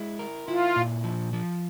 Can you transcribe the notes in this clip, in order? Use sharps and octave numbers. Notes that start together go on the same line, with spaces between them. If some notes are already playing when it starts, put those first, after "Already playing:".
Already playing: G#3 E4
A#4
E4 F4
A#2
F3
F3